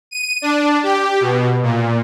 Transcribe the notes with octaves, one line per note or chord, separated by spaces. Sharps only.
D#7
D4
G4
B2
A#2